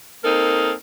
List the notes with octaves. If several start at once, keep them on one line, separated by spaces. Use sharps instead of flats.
A#3 C4 D#4 A4 A#4